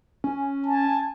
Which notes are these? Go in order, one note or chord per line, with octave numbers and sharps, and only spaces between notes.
C#4
G#5 A5